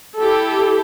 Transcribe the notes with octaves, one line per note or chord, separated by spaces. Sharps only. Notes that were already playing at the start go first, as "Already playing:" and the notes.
E4 G4 A4